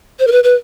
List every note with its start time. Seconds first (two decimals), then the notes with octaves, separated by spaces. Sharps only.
0.20 C5
0.27 A#4
0.32 B4
0.44 B4